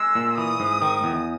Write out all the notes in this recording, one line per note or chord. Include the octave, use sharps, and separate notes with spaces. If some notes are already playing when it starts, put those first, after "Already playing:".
Already playing: G#3 E6
A#2
E3 D#6
G#2
D#3
E2